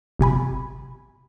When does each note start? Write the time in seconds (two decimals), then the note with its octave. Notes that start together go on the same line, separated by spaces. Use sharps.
0.19 G1 C3 G#5 B5